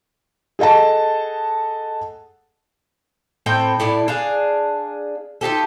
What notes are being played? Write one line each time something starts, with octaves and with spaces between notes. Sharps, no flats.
G#4 A4 D#5 F#5 A5
A2 C4 G5
A2 E4 D5
D4 G#4 F5
D#4 F4 G4 A4